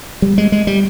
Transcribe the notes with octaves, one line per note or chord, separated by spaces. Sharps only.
G3
G#3
G#3
G3